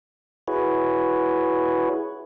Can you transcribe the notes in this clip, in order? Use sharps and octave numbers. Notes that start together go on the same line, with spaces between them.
E4 F#4 G#4 B4 C#5